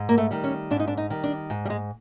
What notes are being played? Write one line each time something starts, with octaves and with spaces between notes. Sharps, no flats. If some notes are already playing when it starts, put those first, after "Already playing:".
Already playing: G#2
A#3
A3
D#3 G3
C#4
G#2 D4
D#4
D4
D#4
D#3 G3
D4
G#2
G3
G#3